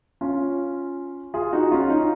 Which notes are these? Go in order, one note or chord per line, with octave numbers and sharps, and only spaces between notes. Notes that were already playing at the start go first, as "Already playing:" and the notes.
C#4 F4
F4 G#4
D#4 F#4
C#4 F4
D#4